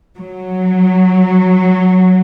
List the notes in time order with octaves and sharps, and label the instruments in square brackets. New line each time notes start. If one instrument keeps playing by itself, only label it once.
[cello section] F#3